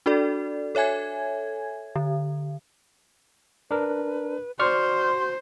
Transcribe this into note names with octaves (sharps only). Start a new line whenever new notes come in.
D4 F#4 A4 D5
A4 C#5 E5 G#5 G#6
D3
D4 A#4 B4
F#4 C5 D5 C6 C#6 F6